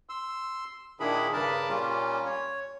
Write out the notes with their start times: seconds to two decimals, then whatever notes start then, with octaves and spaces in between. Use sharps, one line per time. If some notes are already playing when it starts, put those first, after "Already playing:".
0.09 C6 E6
1.00 A#2 D#3 D4 E4 G#4 B5
1.33 G2 C#3 D4 A#4 A5 B5
1.69 A#2 G3 A#3 C#4 F4
2.26 C#5